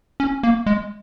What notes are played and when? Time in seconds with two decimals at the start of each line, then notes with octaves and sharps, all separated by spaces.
0.20 C#4
0.43 A#3
0.66 G#3